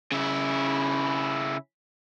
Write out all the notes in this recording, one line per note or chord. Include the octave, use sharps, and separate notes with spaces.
C#3 E4